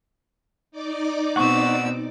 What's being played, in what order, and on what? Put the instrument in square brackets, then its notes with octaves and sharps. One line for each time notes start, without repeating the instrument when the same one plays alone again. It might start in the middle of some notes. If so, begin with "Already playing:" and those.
[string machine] D#4 D5 D6
[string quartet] B2 C4 E6 [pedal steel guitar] F#5 C#6